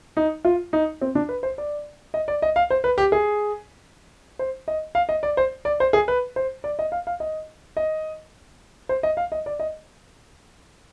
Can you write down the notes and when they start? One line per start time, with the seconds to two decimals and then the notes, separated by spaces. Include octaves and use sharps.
0.17 D#4
0.45 F4
0.73 D#4
1.01 C4
1.15 D4
1.29 B4
1.43 C5
1.58 D5
2.14 D#5
2.28 D5
2.42 D#5
2.56 F5
2.70 C5
2.84 B4
2.98 G4
3.12 G#4
4.39 C5
4.68 D#5
4.95 F5
5.09 D#5
5.23 D5
5.37 C5
5.65 D5
5.80 C5
5.93 G#4
6.08 B4
6.36 C5
6.64 D5
6.79 D#5
6.92 F5
7.07 F5
7.20 D#5
7.77 D#5
8.89 C5
9.03 D#5
9.17 F5
9.32 D#5
9.46 D5
9.60 D#5